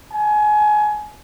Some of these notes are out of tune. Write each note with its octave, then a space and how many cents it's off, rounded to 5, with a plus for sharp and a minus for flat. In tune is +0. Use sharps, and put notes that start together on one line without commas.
G#5 +25